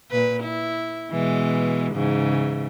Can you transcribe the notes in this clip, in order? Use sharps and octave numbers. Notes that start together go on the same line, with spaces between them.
A#2 B4
E4
B2 E3 G#3
G#2 C#3 E3